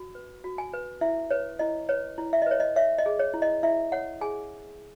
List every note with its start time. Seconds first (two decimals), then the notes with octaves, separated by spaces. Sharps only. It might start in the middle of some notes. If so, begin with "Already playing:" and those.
Already playing: F#4
0.15 B4
0.44 F#4
0.58 G#5
0.73 B4
1.01 E4 E5
1.31 B4 C#5
1.59 E4 D#5
1.89 B4 C#5
2.18 E4
2.33 E5
2.42 D#5
2.47 B4 C#5
2.60 D#5
2.76 C#5 E5
2.99 D#5
3.06 G#4
3.19 C#5
3.34 E4
3.42 D#5
3.63 E4 E5
3.92 C#5 F#5
4.21 G#4 G#5